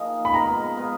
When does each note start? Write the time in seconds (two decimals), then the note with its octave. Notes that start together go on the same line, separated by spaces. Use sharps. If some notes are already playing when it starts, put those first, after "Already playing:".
Already playing: F3 A#3 D#4 G#4
0.25 B5
0.34 G#3 B3 F4 A#5
0.77 G#3 B3 F4